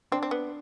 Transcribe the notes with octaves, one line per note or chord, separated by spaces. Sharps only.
C4 D4
C4
B3